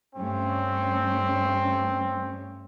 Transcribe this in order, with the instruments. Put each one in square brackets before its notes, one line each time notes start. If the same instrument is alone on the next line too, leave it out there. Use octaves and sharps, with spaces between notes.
[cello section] G2 A3 C#4 [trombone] C4